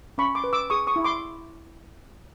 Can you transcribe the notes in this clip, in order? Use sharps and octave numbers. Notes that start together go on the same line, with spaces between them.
C#4 B5 C#6
C6 D6
B4
D6 E6
G#4 C#6 D#6
C#6 D#6
E4
C6 D6